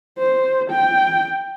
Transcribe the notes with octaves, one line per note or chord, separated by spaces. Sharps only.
C5
G5